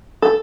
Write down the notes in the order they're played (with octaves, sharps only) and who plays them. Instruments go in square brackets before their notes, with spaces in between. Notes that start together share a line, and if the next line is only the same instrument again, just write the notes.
[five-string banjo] A4